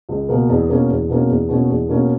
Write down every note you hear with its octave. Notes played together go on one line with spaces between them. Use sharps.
C#2
B2 A#3
E2
B2 A#3 C#4
E2
B2 A#3 C#4
E2
B2 A#3 C#4
E2
B2 A#3 C#4